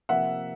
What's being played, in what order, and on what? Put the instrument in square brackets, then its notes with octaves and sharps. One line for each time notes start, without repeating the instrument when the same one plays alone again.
[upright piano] C3 F3 A#3 E5 F#5